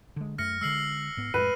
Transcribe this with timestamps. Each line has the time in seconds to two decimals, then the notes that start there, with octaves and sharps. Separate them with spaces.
0.16 D3 G#3
0.38 F#2 A3 F6 A#6 C#7
0.61 D3 G#3 E6 C7 F#7
1.17 G#2 B3
1.34 F2 A2 G#3 B4 D#7